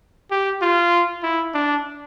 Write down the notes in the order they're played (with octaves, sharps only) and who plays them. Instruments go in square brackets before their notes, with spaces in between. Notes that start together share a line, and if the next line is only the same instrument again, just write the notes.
[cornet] G4
F4
E4
D4